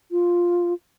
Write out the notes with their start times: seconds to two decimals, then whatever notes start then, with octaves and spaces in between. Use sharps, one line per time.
0.11 F4